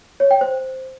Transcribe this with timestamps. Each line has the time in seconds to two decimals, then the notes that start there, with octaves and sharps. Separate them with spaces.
0.20 C#5
0.31 G5
0.41 C5